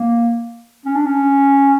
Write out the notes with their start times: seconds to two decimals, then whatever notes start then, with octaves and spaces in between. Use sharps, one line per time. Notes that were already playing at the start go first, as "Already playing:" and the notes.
Already playing: A#3
0.85 C#4
0.96 D4
1.06 C#4